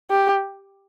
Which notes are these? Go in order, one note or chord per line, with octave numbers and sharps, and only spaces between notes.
G4